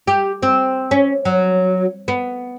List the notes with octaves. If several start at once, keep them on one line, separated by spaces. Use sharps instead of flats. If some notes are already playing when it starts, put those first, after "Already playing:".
G4
C4
C#4
F#3
B3